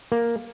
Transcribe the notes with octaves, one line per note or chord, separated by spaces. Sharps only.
A#3